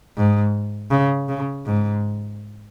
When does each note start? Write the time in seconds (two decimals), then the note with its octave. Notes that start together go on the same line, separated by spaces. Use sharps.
0.17 G#2
0.91 C#3
1.29 C#3
1.66 G#2